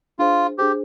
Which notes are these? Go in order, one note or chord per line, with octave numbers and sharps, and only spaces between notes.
D4 F4 G#4 C5
D4 G4 G#4 C5